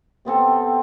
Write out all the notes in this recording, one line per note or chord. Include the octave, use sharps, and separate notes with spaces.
C3 B3 C4 A4